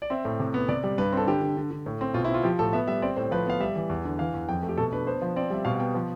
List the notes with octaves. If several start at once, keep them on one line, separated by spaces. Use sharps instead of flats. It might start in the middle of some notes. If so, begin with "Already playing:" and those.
D5
C4 E5
A2
C3
B3
C3 D5
G3
G2 B4
C4 A4
D3 G4
D3
D3
D3
A2
C4
B2 F4
E4
C4
F4
F3 G4
A2 A4
B3 E5
G3 E5
C4 D5
A2 C5
F3 B4
B3 F5
G3 E5
E3
E2
D3
E3 F5
E2
F2 G5
A3
G4
B2 A4
D4 B4
B3 C5
F3
C4 D5
G3 E5
B2 F5
F5
B3 G5
F3